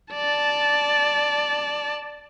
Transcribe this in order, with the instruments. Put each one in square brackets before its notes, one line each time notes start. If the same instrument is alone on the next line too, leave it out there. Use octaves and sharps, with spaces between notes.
[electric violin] D5 A5